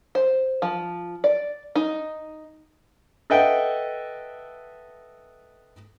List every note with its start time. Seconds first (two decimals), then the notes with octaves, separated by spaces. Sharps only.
0.15 C5
0.62 F3
1.24 D5
1.76 D#4
3.30 A4 B4 D#5 E5 F#5 G5